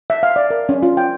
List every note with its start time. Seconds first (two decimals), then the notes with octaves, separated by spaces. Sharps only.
0.10 E5
0.23 F5
0.36 D5
0.50 A#4
0.69 C#4
0.83 F4
0.97 G5